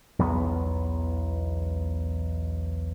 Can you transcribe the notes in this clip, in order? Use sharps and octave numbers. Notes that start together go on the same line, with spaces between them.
B1 E2 B3